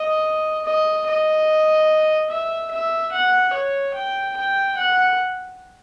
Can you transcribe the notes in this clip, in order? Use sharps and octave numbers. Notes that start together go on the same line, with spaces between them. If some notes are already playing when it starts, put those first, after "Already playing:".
Already playing: D#5
D#5
D#5
E5
E5
F#5
C#5
G5
G5
F#5